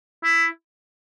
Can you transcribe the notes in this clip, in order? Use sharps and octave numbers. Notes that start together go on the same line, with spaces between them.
E4